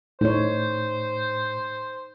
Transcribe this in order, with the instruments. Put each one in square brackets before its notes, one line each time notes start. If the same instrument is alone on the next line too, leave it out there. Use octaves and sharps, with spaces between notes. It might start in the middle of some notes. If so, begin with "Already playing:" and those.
[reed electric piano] A2 [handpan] D#4 C#5 [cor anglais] C5